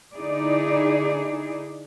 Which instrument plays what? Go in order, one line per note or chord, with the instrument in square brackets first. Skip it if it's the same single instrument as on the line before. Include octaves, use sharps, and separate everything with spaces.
[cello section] D3 D#4 E4 G#4 D5